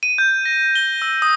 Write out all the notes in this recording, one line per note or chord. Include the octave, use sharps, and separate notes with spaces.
D#7
G6
A#6
G7
E6
D#6